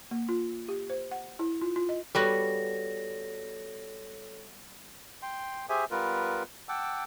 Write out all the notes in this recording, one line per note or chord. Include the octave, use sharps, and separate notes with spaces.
A#3
F4
G4
C5
F#5
E4
F4
F4
D#5
G3 B3 F#4 A4 C#5 A#6
G5 C6
G4 G#4 C5 E5 G#5
G3 B3 F4 A#4 B4
F#5 G5 A5 D6 E6